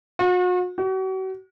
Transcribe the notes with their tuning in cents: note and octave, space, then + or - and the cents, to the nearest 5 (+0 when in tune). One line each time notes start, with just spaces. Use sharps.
F#4 -40
F#4 +40